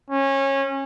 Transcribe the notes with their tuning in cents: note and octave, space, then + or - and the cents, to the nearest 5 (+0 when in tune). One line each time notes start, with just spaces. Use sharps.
C#4 -25